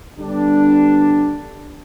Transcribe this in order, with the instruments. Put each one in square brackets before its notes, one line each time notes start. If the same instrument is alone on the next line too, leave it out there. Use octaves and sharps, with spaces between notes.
[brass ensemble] D3 G3 B3 D4